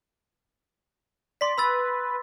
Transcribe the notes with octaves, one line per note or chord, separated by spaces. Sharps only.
D5 C6 B6
B4 B5 E6 A6